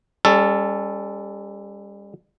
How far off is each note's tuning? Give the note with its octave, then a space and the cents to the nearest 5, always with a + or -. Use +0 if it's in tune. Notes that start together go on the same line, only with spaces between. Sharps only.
G3 +40 C#4 +0 A4 +0